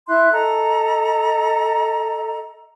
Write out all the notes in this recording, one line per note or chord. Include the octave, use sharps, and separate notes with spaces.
E4 E5 C6 F#6
A4 D#5 A#5